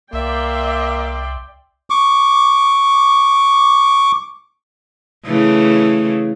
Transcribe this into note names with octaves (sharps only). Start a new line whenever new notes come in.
C2 A#3 D5 E5 G5 C6
C#6 D6
C#3 E3 A3